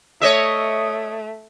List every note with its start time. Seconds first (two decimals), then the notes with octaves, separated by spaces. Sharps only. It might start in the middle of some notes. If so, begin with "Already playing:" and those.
0.22 A3 C#5 D#5 E5